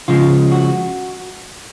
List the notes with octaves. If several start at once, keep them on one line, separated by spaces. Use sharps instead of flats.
C#3 F3 G#3 F4
F#4